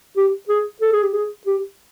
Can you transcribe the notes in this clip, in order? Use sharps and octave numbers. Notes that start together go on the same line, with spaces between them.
G4
G#4
A4
G#4
G4
G#4
G4